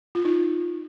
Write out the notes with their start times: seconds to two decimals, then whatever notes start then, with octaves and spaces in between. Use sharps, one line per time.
0.15 F4
0.25 D#4